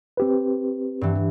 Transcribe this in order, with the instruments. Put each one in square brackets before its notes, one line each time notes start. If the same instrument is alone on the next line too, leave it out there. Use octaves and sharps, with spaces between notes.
[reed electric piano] C4 G4 B4
[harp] G2 E3